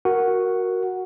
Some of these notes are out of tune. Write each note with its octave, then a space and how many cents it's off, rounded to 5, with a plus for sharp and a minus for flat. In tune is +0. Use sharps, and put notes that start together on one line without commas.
F#4 +0 A#4 +0 F#5 +0